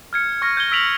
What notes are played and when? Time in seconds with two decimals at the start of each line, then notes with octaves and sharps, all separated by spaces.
0.13 F6 G#6 C#7
0.42 C#6 F6 A#6
0.57 G6 G#6 G7
0.72 E6 B6 D7 F7 F#7